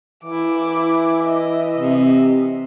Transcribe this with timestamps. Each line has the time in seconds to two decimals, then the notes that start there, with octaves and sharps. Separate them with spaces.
0.24 E3 E4 D6
1.22 D#5 E5
1.76 C3